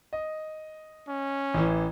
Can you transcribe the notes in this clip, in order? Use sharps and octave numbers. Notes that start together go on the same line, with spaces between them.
D#5
C#4
A1 E3